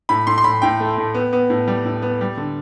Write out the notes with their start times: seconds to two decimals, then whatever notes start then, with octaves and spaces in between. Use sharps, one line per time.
0.09 A2 B5
0.27 A2 C6
0.38 C6
0.44 A2 B5
0.62 A2 G5
0.80 A3
0.98 A2
1.14 B3
1.33 B3
1.50 A2
1.68 G3
1.85 A2
2.02 B3
2.21 G3
2.37 D3